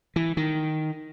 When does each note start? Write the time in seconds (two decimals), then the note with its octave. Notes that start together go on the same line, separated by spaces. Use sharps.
0.16 E3
0.37 D#3